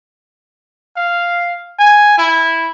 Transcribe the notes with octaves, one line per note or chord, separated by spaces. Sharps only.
F5
G#5
E4